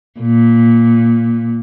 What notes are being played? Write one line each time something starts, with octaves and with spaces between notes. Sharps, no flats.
A#2